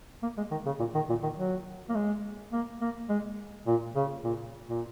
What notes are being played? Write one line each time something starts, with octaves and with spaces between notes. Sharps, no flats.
A#3
G#3
D#3
C#3
A#2
D#3
A#2
D#3
F#3
A#3
G#3
A#3
A#3
G#3
A#2
C#3
A#2
A#2